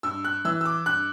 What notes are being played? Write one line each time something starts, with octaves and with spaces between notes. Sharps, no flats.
G2 E6
F#6
E3 E6
E6
D6
G2 F#6